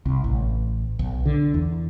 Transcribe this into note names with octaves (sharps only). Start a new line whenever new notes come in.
C2
A1
B1
D3
E2